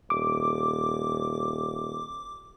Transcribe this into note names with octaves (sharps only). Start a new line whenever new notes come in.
D#1 D6